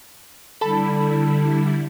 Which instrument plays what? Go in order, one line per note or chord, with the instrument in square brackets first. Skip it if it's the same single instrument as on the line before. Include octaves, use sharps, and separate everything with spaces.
[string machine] D3 G3 E4 [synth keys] A4 A5 B5